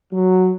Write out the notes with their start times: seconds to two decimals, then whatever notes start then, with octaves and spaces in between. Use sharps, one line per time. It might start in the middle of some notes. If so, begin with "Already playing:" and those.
0.13 F#3